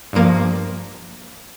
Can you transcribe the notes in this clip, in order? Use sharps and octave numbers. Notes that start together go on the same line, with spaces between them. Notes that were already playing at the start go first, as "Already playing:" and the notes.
G2 F3 A#3